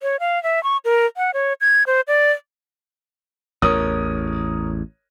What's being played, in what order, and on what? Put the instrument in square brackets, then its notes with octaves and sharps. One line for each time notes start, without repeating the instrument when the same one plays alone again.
[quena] C#5
F5
E5
C#6
A#4
F#5
C#5
G#6
C5
D5
[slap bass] A1 E2 [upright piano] A#4 C#5 D#6